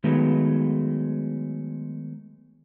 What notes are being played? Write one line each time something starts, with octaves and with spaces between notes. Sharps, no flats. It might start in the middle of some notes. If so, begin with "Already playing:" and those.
D#3 F#3 G#3 A3 B3